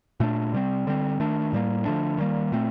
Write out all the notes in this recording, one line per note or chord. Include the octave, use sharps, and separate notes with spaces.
A#2 A3 D4
C3 G3 C4
D3 G3 C4
D#3 A3 D4
A2 G3 A#3
D3 F3 A3 D4
D#3 G3 A#3
A#2 A3 C4